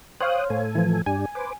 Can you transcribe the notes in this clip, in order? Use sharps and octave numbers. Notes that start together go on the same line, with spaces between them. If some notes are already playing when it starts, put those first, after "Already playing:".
C5 C#5 F5 G5 D#6 F#6
A2 A4 G#5
E3 F3
G2 D4 G4 G#5
B4 C5 D6